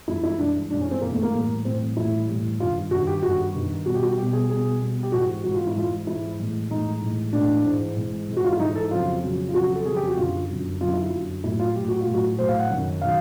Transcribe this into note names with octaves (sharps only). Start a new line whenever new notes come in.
G2 E3 G#3 E4
E4
G2 E3 G#3 D4
G2 E3 G#3 D4
C#4
C4
G2 E3 G#3 A#3
A3
A#3
A2 E3 G3
A2 E3 G3 C4
A2 E3 G3 E4
A2 E3 G3
G2 D#3 G3 F4
G2 D#3 G3 F#4
G4
G2 D#3 G3 F#4
G2 D#3 G3
B2 G3 F#4
G4
F#4
B2 G3 G4
G#4
B2 G3 G#4
B2 G3
G4
G#2 E3 G#3 F#4
G#2 E3 G#3 F#4
F4
E4
G#2 E3 G#3 F4
G#2 E3 G#3 E4
A2 E3 G#3
A2 E3 G#3 D#4
A2 E3 G#3
A2 E3 G#3 D4
G#2 E3 G#3
G#2 E3 G#3
G#2 E3 G#3
F#4
F4
E4
G#2 E3 G#3 D#4
A4
F2 C#3 F#3 F4
F2 C#3 F#3
F4
F2 C#3 F#3 F#4
A4
F2 C#3 F#3 G#4
G4
F#4
F#2 D3 F#3 F4
F#2 D3 F#3
F#2 D3 F#3 F4
E4
F4
F#2 D3 F#3
A2 F#3 E4
F4
A2 F#3 G4
F#4
F4
A2
F#3 F#4
A2 F#3 C5
F5
F#5
F#2 D#3 F#3
D#3 F#3 F5